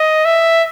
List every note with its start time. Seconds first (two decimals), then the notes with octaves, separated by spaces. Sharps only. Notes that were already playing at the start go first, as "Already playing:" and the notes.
Already playing: D#5
0.25 E5